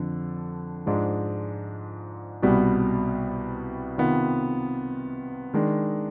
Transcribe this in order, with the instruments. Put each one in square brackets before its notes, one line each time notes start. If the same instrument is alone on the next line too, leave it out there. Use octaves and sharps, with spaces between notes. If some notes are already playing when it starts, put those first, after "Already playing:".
Already playing: [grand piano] F2 D3
G#2 F3 G#3 D4
C2 B2 G3 B3
C3 D#3 B3 F4
D#3 G#3 D4